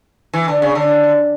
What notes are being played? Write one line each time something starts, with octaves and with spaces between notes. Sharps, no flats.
E3
D3
C#3
D3